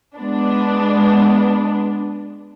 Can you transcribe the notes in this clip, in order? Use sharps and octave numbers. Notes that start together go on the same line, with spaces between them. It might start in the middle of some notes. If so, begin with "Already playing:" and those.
G#3 B3 D4